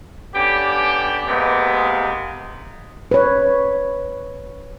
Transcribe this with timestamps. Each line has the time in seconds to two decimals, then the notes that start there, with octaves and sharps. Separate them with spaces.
0.34 D3 B3 C#4 G4
1.28 C3 G#3 A#3 B3
3.11 B4 C#5